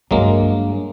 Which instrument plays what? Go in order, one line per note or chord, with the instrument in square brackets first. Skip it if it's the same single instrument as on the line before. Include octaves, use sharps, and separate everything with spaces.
[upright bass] G2 D4 [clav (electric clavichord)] F#3 G#3 A#3